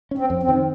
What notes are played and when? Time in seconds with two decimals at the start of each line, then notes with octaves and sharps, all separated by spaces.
0.11 C#4
0.18 C4
0.30 F2
0.43 C4
0.48 D#3